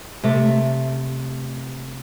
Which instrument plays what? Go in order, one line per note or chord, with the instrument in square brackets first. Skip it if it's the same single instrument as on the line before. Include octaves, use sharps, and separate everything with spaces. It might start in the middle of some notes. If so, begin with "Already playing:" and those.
[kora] C3 A3